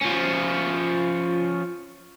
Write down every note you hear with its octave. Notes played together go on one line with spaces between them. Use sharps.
F3 C#4